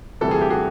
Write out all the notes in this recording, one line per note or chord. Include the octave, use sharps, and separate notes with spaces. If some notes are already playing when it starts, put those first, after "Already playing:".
D2 C3 E3 G3 A4
G#4
G4
F#4 G#4